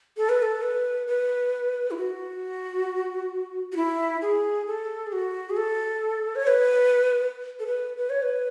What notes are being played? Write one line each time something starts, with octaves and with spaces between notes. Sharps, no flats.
A4
B4
A4
B4
B4
E4
F#4
F#4
E4
G#4
A4
G#4
F#4
G#4
A4
C#5
B4
A4
B4
B4
C#5
B4